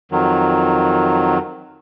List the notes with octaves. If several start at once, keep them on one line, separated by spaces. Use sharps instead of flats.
F2 D#3 F#3